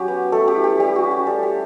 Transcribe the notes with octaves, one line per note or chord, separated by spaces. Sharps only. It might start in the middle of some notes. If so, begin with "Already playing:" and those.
Already playing: F#3 C#4 G4
B3
A3 A4
G4
E4
G4
G3 G4
F#4
C#4
G4
G3 A4
G4